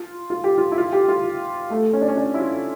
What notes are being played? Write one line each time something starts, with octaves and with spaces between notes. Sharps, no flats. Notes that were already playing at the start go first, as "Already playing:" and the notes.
Already playing: F4
F4
G4
F4
E4
F4
G4
F4
A3
C#4
D4
C#4
D4
E4
F4